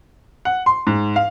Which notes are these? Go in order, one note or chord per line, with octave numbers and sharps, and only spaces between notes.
F#5
C6
G#2
F5